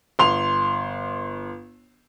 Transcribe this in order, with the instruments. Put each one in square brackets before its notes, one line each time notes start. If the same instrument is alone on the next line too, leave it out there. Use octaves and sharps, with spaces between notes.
[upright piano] G1 C6 F7